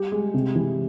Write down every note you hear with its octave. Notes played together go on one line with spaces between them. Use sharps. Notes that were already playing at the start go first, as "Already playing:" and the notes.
Already playing: G3 G4
G#3
C3
E3